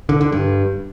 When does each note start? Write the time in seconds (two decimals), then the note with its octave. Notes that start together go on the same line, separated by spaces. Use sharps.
0.09 D3
0.21 D3
0.32 G2